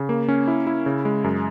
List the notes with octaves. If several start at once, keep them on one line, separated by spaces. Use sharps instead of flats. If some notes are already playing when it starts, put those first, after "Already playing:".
Already playing: C#3
A#3
C#4
E4
E4
C#3
G#3
F#2